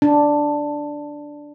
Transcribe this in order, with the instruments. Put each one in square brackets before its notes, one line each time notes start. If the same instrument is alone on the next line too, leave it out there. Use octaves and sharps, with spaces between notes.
[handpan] D4